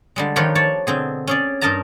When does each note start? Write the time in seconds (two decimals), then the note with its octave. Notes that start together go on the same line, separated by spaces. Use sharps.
0.16 D3 G3 G#3
0.36 D#3 F3 F4 G4 B4 C#5
0.55 C#5 D5 A5
0.87 B2 D3 C4 G#4
1.27 C#4 G#4 D5
1.61 G2 D#4 A#4 D#5 A5 A#5